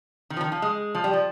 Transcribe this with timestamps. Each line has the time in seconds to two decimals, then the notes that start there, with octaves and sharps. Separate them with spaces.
0.30 D#3
0.37 F3
0.41 D#3
0.52 F3
0.62 G#3
0.95 F3
1.04 G3
1.13 F3